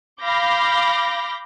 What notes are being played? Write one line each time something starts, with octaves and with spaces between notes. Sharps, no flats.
F5 B5 D6 G6 A#6